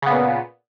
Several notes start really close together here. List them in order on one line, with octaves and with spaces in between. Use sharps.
C#3 B3 A#2